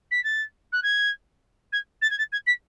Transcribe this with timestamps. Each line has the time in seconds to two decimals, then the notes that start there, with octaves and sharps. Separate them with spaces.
0.11 B6
0.24 A6
0.73 F#6
0.83 G#6
1.73 G#6
2.02 A6
2.11 G#6
2.19 A6
2.32 G#6
2.47 B6